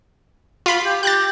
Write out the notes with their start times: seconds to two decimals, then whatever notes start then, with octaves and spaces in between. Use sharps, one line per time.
0.66 F4 B5
0.83 G4
1.03 G4 F#6 G6 A6